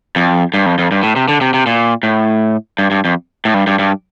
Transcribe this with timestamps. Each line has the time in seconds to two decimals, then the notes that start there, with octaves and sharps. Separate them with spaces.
0.16 F2
0.54 G2
0.66 F2
0.78 F2
0.92 G2
1.03 A2
1.16 C3
1.28 D3
1.41 C3
1.54 C3
1.66 A#2
2.03 A2
2.79 G2
2.91 G2
3.05 F2
3.45 A2
3.54 G2
3.67 G2
3.79 G2